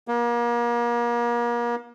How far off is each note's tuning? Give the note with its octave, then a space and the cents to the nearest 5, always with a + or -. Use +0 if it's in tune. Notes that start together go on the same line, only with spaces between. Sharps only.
A#3 +35